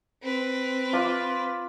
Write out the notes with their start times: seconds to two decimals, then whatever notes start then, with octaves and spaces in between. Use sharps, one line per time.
0.22 C4 B4
0.93 F4 D6